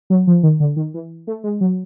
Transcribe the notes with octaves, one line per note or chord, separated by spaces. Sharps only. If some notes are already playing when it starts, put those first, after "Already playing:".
F#3
F3
D#3
D3
D#3
E3
A3
G#3
F#3